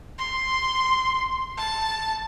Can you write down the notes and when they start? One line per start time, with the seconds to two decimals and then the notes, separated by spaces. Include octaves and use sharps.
0.18 C6
1.57 A5